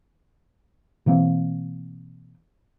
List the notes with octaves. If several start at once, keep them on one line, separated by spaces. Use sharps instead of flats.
B2 E3 A#3 C4